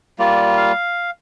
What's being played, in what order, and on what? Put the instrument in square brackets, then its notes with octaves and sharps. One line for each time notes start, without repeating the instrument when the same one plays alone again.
[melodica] G3 A#3 F4 D5
F5